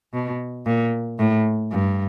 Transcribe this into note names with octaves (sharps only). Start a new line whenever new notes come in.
B2
A#2
A2
G2